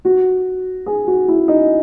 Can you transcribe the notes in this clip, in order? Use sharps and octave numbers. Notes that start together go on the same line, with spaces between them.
F#4
G#4
F#4
E4
D#4